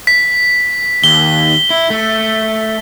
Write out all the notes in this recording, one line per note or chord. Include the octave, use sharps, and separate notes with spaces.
B6
D#2 G7
E4
A3